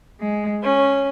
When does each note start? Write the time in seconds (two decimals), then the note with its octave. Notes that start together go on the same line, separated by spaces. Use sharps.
0.21 G#3
0.63 C#4